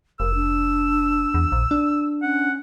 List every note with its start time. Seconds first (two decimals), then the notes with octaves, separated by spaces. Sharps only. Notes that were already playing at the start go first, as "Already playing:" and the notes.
0.20 F1 A#4 E6
0.35 D4
1.34 E2
1.52 A#1
1.71 D4
2.22 C#4 F#5